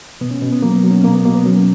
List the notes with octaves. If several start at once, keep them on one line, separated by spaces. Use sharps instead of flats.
B2 B3
C#4
B2
B3
F#3 A#3
B3
F#3
C#4
B2 A#3
B3
B2 A#3
B3
F#3 C#4